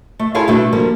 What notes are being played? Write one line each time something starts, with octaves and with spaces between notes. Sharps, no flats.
A3
E4 F4 G#4 A4 C#5 F5
B2 G3 A3 D4 E4 A4
F3 G3 A#3 A4